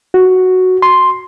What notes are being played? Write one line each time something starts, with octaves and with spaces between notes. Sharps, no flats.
F#4
C6